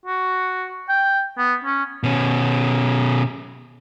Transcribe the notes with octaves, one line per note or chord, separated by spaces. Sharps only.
F#4
G5
B3
C#4
B2 C#4